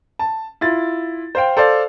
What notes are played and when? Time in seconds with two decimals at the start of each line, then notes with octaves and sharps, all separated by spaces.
0.19 A5
0.61 E4 F4 A6
1.35 C5 F5 G5
1.57 A4 C5 D5 F5